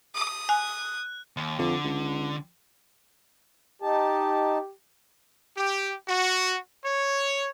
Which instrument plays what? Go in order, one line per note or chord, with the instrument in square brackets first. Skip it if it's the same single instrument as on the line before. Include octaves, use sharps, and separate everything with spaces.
[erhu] D#6
[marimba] G#5 [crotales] F#6
[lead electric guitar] D#2
[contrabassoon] F2 [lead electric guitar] D3
[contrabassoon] C#2
[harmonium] D#4 A5 [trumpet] G4
[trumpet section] G4
F#4
C#5